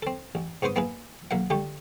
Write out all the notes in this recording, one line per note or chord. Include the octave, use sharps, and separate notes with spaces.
C4 A4
A1
G#2 B3 B4 C5 C#6 D#6
A#3 B3 E4 G#4 B4
B1 A#3 E5 F#5
D3 G3 A3 G4